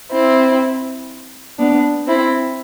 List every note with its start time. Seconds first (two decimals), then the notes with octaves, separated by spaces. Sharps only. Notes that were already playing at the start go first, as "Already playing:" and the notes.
0.11 C4 E4
1.58 B3 D4
2.07 C4 E4